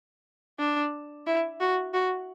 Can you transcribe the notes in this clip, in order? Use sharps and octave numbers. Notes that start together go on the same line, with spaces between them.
D4
E4
F#4
F#4